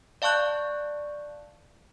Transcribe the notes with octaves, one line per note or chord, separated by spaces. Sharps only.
D5 F5 A5 C#6 F#6 G6